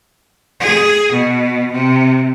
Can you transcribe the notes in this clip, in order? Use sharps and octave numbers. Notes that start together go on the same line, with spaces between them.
G#4
B2
C3